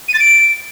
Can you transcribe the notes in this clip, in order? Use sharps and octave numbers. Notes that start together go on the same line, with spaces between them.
D#7
A6
D7